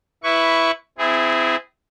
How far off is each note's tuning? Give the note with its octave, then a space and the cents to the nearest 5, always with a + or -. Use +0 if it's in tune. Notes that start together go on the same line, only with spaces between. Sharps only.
E4 +0 B4 +0 C#6 +10
C4 -30 E4 +0 G#4 +0